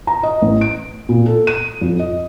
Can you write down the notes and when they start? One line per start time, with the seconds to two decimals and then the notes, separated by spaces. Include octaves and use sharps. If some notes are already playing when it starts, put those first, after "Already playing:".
0.07 A#5
0.23 D#5
0.42 A1
0.61 D7
1.09 A#2
1.26 A4
1.47 D#7
1.81 F2
1.99 D#5